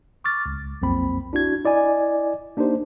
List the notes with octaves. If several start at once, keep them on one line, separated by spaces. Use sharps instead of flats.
C#6 D6 F6 A6
C#2
B1 F2 A#3 C4 B5
D4 E4 F#4 G#6
E4 D5 D#5 G#5
A#3 D4 D#4 G4 C5